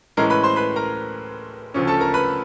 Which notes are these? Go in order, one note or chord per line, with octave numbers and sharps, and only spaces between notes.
A2 E3 G#3 C#4 A#4 A#5
B4 B5
C5 C6
B4 B5
A#4 A#5
D2 C#3 F3 A3 C#4
A4 A5
A#4 A#5
B4 B5